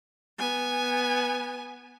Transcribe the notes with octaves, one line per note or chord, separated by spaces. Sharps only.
B3 G#5